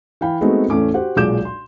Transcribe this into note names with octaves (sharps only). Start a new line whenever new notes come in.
E3 F5 G5 B5
G#3 A3 B3 C4 D#4 F#4
E2 A2 A3 C#4 D6
F#4 G4 C5 F#5
B1 A#2 G#3 D6 G6 E7
C6